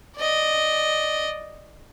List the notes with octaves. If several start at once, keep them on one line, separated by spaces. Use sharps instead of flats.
D5 D#5